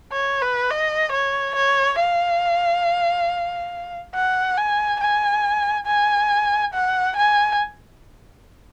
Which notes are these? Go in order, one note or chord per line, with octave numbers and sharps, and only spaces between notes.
C#5
B4
D#5
C#5
C#5
F5
F#5
G#5
G#5
G#5
F#5
G#5